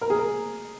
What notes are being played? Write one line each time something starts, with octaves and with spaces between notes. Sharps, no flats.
A#4
G#4
A#4